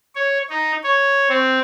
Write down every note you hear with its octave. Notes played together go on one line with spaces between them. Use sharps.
C#5
D#4
C#5
C4